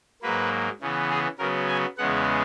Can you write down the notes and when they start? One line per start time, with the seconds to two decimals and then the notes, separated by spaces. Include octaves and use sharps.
0.22 G#2 F#3 A#3 B4
0.81 C#3 E3 B3
1.10 G#4
1.39 C#3 F#3 B3 A#4
1.68 G#5
1.98 E2 C#3 G#3 B3 F#5